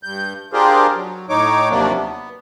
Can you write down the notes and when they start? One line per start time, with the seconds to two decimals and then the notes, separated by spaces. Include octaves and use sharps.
0.03 G2 G6
0.53 D4 F4 G4 G#4 A#4 C5
0.95 F#3
1.29 A2 D#4 C#5 D6
1.70 D#2 C3 F3 F#3 A#3 D4
1.94 B3